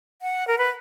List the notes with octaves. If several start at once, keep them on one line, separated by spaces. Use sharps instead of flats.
F#5
A#4
B4